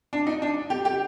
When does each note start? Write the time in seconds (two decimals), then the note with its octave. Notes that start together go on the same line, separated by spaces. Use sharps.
0.13 D4
0.27 D#4
0.42 D4
0.70 G4
0.85 G4